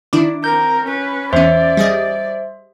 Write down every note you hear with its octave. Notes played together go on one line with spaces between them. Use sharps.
D#3 D4 E4 D6
C4 A#4 G6
C#4 B4
E2 C#4 C5 D5 E5 C6
G3 G#4 D#5